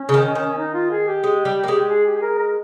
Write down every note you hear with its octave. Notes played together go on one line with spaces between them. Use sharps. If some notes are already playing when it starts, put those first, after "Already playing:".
Already playing: C#4
C#3
D#3
D#3
D#4
F4
G#4
G4
G#3
G3
A#3
G#3
G#4
G4
G#4
A#4
A#4